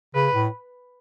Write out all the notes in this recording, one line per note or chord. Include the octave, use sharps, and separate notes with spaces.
C#3 B4
A2